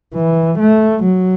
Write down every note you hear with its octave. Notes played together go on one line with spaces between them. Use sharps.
E3
A3
F#3